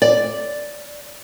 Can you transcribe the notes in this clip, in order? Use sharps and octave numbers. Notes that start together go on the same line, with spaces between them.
D5